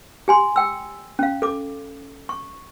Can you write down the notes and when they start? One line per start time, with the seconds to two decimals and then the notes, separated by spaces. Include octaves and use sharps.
0.28 G4 G#5 C6
0.56 G5 E6
1.19 C#4 F5
1.42 A4 D6
2.29 C#6